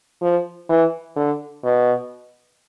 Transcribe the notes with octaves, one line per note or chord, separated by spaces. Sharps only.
F3
E3
D3
B2